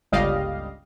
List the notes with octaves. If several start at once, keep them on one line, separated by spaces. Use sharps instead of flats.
G1 C#2 G3 D#5 F5